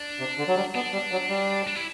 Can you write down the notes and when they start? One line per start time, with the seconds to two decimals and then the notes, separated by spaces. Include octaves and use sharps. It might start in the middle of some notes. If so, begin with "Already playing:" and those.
Already playing: D4
0.19 C3
0.38 D3
0.48 F#3
0.56 G3
0.75 B3 D4
0.93 G3
1.12 F#3
1.29 G3
1.67 D4
1.75 E4